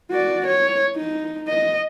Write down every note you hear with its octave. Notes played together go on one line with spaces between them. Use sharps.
F#4 D5
C#5
D#4
D#5